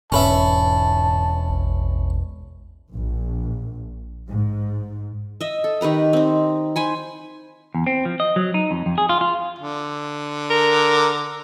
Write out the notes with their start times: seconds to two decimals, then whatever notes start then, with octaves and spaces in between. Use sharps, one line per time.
0.12 E1 G#2 C#4 B4 E5 A5
1.49 A1
2.92 A#1
4.28 G#2
5.41 D#5 E5
5.64 A4
5.81 D#3 G4 B4 A#5
6.13 C4 D#4
6.76 C5 G#5 B5
7.75 E2
7.87 C4
8.05 F3
8.20 D#5
8.36 F#3
8.54 D#4
8.71 F2
8.86 F2
8.98 G#4
9.09 F4
9.21 F4
9.59 D3
10.50 A#4